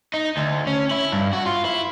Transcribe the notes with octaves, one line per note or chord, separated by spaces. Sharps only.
D#4
D2
C#4
E4
G2
F#4
F4
E4